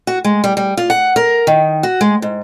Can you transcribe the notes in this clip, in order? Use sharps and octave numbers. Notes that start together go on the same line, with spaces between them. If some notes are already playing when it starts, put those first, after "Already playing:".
F#4
G#3
G3
G3
F4
F#5
A#4
D#3
F#4
G#3
G#2